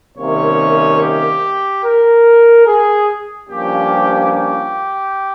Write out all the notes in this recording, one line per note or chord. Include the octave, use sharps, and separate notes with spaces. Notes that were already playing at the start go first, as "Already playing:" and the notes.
C2 C3 D#3 A#3 C#4 C#5
G4
A#4
G#4
G2 F3 A#3 C#4 G4
G4